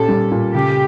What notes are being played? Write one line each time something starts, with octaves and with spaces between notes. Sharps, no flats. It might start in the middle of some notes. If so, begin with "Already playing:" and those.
Already playing: A#2 C#4 G4 A4
G3
A#2
C#3 G4